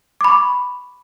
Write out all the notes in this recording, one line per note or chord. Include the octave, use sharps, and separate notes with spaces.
B5 C#6 D6